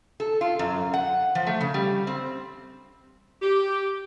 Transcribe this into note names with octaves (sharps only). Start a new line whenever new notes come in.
A4
F4
F#2
F#5
F3
A3
C#3
G3
C4
G4